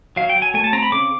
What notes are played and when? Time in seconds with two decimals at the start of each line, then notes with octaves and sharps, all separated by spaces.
0.16 F#3 F5
0.29 G5
0.36 F#3
0.42 G#5
0.54 A3 G#5
0.64 A5
0.73 C4 A#5
0.83 B5
0.92 C#3 D6